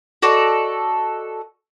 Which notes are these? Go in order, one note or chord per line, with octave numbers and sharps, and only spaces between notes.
F#4 A4 D5 D#5